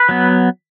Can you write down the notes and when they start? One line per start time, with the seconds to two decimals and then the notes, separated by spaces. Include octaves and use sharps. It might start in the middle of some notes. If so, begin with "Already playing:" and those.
Already playing: B4
0.09 F#3 B3